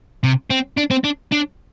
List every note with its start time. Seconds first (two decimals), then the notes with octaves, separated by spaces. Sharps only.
0.24 C3
0.50 C4
0.77 D4
0.91 C4
1.04 D4
1.32 D4